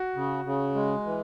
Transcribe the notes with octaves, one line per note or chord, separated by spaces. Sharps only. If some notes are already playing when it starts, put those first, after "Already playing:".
Already playing: F#4
C#3
C#3
G#3
E3